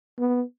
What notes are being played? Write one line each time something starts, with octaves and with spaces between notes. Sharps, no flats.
B3